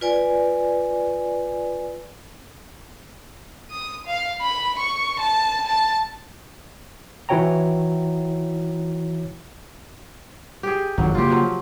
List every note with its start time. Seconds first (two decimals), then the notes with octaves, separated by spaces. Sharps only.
0.01 F4 B4 D5 G#5
3.71 D#6
4.06 F5
4.41 B5
4.79 C#6
5.19 A5
5.66 A5
7.29 E3 E4 F#4 C#5 G5 A#5
10.63 G4 G#4
10.98 G#1 F2 D3 F#3
11.15 C#3 A3 A#3 F4 G4
11.30 F3 F#3